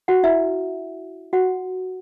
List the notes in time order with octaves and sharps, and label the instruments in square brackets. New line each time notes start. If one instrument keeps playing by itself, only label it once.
[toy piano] F#4 F#5
E4 E5
F#4 F#5